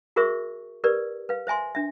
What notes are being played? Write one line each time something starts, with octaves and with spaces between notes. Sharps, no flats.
F#4 G#4 A#4 C5 E5 C#6
G4 A#4 B4 D5
B4 F5
C5 E5 G#5 C6
D4 E5